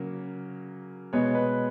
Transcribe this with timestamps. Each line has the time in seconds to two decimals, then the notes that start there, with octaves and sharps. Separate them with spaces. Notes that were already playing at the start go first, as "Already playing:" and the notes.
Already playing: C#3 F#3 A#3
1.13 B2 G#3 B3 C#5
1.35 B4